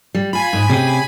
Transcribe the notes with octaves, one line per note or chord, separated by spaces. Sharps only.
G3
F4 G#5 B5
G#2 D#5
C3 C#4 G4 G#4